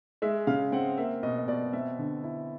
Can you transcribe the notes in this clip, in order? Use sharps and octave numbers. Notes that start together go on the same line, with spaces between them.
G#3 E5
C#3 F5
C4 F#5
A#3 E5
B2 D#5
D#5
B2 D5
C4 E5
D3
E4